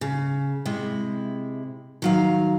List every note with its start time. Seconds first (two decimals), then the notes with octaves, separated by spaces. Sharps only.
0.01 C#3
0.65 C3 G#3 E4
2.02 D#3 F#3 F5